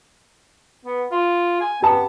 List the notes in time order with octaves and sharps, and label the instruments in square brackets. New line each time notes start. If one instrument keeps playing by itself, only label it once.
[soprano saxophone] B3
F4
G#5
[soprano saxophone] B3 [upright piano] G4 A5